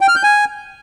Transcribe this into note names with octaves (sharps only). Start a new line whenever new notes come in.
G5
F6
G6
G#5